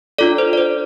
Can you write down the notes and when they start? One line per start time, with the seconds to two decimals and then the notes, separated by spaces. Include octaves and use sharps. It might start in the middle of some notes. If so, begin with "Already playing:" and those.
0.18 D4 F4 A4 D5
0.38 C5
0.53 D5
0.58 C5